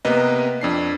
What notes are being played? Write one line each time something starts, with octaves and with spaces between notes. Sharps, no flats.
C3 A#3 B3 B4 D#5
F2 D4 C7